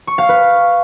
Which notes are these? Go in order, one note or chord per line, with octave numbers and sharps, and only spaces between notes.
C#6
F5
B4